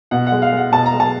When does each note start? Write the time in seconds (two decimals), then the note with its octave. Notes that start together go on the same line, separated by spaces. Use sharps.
0.11 B2 F#5
0.27 F#5
0.32 G#3
0.42 F5
0.52 G#3 F#5
0.72 B2 A5
0.86 A#5
0.93 G#3
1.00 A5